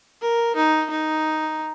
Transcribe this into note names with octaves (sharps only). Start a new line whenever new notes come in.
A#4
D#4
D#4